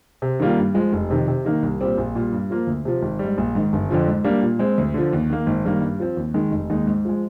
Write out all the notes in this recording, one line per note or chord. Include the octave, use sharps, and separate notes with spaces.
C3
D#3 G3 A#3 F4
G2
F3 G#3
F1
F2 C3 D#3
C3
D#3 A#3 D#4
C2
A#2 G3 C4 G4
A#1
A#2 G3
G2
F3 A#3 F4
D2
C3 F3
G#1
G#2 G3
A#1
G#2 D#3
G1
F2 D3 F3
G#2
G3 A#3 D4
A#2
G#3 C4
D2
D3 F3
D#2
D#3 A#3
G#1
G2 D#3 G3 A#3
G2
F3 C4
D#2
D#3 G#3
F1
D#2 D#3 G#3 D#4
G#2
F3 G#3